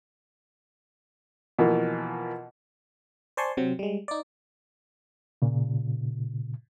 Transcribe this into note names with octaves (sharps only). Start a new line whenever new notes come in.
B2 E3 F3 A#3
C5 D5 G#5 A5 C6 C#6
C3 F#3 C4
G3 G#3
D#4 D5
A#2 C#3